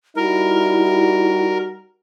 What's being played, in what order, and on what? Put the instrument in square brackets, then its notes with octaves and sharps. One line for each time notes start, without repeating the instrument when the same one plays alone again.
[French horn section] G3 D#4 F#4 [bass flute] E4 [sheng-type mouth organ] A#4